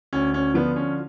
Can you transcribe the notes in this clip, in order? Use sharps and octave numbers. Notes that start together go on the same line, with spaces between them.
D2 C#4
C#4
D3 F3 B3
C#4